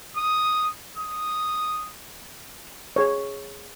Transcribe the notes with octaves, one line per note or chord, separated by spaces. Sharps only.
D#6
D#6
G#4 C#5